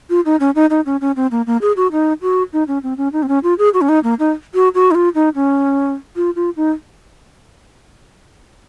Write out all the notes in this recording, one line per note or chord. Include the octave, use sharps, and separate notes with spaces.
F4
D#4
C#4
D#4
D#4
C#4
C#4
C4
A#3
A#3
G#4
F#4
D#4
F#4
D#4
C#4
C4
C#4
D#4
C4
C#4
F4
G#4
F#4
C#4
D#4
A#3
D#4
F#4
F#4
D#4
F4
D#4
C#4
F4
F4
D#4